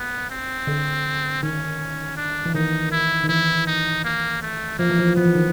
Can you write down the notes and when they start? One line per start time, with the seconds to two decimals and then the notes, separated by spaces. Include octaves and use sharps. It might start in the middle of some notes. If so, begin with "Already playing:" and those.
Already playing: B3
0.30 C4
0.67 D3
1.43 D#3 C#4
2.17 D4
2.46 E3
2.55 D#3 D#4
2.92 E4
3.23 D#3
3.29 E3 E4
3.67 D#4
4.04 A#3
4.42 A3
4.79 F3 A#3
4.90 E3
4.99 F3
5.16 F3 B3
5.26 E3
5.35 D#3